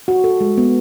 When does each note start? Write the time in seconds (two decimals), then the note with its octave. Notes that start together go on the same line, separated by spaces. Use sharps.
0.08 F#4
0.24 A4
0.41 G#3
0.58 B3